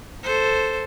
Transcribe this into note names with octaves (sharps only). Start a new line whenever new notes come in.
A4 C5